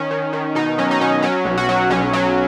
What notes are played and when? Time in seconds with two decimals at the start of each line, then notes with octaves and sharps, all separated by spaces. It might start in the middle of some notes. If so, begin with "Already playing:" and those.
Already playing: D#3 C#4
0.11 D#3
0.33 D#3
0.55 B2 D#4
0.78 F#3 C#4
0.91 D#4
1.00 B2 C#4
1.23 F#3 C#4
1.45 B1
1.57 F#4
1.69 F#3
1.90 B1 C#4
2.13 F#3